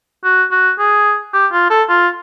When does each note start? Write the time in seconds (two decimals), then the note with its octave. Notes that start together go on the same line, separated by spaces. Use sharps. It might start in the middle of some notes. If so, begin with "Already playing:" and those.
0.24 F#4
0.51 F#4
0.79 G#4
1.34 G4
1.52 F4
1.70 A4
1.89 F4